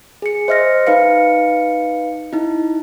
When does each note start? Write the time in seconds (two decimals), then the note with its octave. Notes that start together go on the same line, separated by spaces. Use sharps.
0.22 G#4 C#7
0.48 C5 D#5 E5 F6 A#6
0.87 D#4 B4 F5 C#7
2.33 D#4 E4